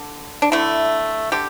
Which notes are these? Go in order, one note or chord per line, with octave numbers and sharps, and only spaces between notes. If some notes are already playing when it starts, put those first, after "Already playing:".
Already playing: D3
D4
D3 A3 E4
D3 G4